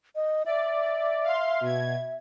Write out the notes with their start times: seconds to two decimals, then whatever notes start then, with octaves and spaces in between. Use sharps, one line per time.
0.16 D#5
0.46 D5 E5
1.24 F5 C6
1.61 B2 G#6